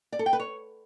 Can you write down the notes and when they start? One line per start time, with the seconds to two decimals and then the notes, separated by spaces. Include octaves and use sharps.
0.12 D5
0.19 A4
0.26 G5
0.33 B4
0.40 C#5